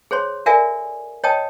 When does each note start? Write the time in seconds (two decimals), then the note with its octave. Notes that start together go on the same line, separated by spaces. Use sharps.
0.11 G#4 C5 C#5 C6
0.46 F#4 A4 A#4 D5 E5 G#5
1.24 C#5 D#5 G5 A5 D#6